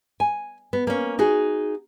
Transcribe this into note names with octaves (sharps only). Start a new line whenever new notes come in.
G#5
B3
A#3 C#4
D#4 F#4 G#4